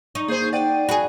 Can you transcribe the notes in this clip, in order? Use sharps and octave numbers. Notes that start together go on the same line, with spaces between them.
D#4 C#6
A#3 G#4 C5 G6
D5 F#5 G5 D#7
F#4 G#4 B5